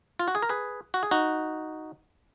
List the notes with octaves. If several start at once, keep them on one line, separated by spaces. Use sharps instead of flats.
F4
F#4
G#4
A#4
G#4 B4
F#4
G#4
D#4 F#4